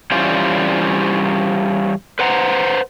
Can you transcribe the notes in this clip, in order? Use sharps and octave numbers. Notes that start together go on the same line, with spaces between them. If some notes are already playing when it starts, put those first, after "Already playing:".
E3 G3 C#4 F4 C5 D5
B4 C5 F#5 A#5